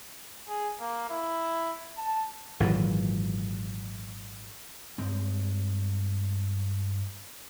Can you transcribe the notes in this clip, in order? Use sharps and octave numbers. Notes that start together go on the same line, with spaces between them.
G#4
A#3
E4
A5
G#1 A#2 E3 F#3
G2 G#3 C4